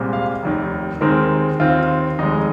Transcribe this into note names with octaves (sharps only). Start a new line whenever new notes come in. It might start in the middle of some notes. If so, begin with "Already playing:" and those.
Already playing: C2 A#2 G#3 C4
F5
F1 D#2 D#3
D#2 D#3 G#3 C4 A#4
D#2 D#3 C4 F4
F1 D#2 D#3 G#3 D#4